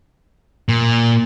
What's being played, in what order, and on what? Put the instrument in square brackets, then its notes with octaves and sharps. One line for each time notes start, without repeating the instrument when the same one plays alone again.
[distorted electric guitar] A#2